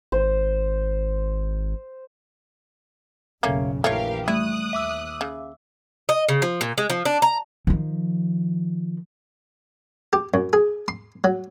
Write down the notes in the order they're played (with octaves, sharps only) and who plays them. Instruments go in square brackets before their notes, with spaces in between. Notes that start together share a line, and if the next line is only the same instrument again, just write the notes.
[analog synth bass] G#1 [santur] C5
[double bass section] F#1 B1 C#3 [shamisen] A3 A#3 C#4
[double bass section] A#1 E3 [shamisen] A3 F4 C#5 [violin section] G4 A#4 F5
[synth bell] G3 A3 [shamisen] E4 [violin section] D#6 F#6
[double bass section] D#2 [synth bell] E5 D6 E6
[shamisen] C#3
[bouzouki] D#5
C#3
F3
A#2
G#3
F3
D4
A#5
[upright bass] D#3 F3
[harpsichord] G4
F#2
G#4
C6
F#3